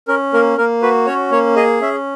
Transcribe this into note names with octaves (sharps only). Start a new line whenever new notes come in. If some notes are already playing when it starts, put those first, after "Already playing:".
C#4 A#4
A#3 A#4
A#3 A#4
F#4 B4
C#4 C#5
A#3 C#5
G#4 D#5
C#4 E5